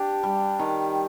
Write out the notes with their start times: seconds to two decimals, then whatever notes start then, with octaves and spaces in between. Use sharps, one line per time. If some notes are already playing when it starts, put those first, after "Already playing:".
Already playing: D4 G4
0.23 G3
0.59 D#3